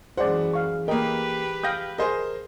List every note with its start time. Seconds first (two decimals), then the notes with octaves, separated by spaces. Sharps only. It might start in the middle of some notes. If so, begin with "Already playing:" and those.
0.18 F#2 E3 G#3 C5 D5 F#5
0.53 F5 C#6
0.88 A#3 G4 A#4 B4 D#5 G5
1.64 F5 G5 D#6 G6 A#6
1.98 G#4 A#4 C5 D#5